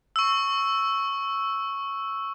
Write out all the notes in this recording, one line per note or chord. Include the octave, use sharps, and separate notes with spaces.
C#6 E6